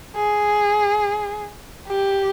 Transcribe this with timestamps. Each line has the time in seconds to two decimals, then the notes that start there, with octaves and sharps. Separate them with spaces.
0.16 G#4
1.88 G4